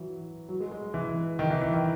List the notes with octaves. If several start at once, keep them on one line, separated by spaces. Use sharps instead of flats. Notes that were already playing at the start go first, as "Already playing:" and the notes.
Already playing: E3 F#3
F#3
G#3
G#3
E3
D#3
E3
E3
D#3